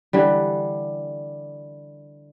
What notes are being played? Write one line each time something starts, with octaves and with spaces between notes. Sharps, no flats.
D3 E3 G3